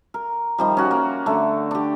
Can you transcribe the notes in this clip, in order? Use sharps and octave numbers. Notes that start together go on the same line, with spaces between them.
A#4
D#3 F3 G3
C#4 F#4
A#3
D3 A3
D4 G4